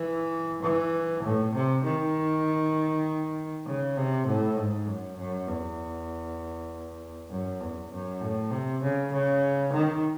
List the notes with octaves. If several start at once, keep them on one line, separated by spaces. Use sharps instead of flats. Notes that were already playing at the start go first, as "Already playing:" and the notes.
Already playing: E3
E3
A2
C3
D#3
C#3
C3
A2
G#2
F#2
F#2
E2
F#2
E2
F#2
A2
C3
C#3
C#3
D#3